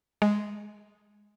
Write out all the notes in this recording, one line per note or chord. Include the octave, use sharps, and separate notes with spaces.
G#3